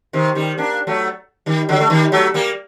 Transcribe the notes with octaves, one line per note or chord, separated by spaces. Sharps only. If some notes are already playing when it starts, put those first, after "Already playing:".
C3 D#3
D#3 G3
A#3 D4
F#3 A3
D#3 G3
D3 F#3
A3
D#3 G3
F#3 A3
G3 A#3